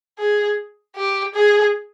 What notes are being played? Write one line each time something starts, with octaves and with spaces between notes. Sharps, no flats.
G#4
G4
G#4